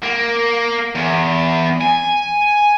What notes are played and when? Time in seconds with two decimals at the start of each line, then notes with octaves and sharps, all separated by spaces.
0.03 A#3
0.95 E2
1.81 G#5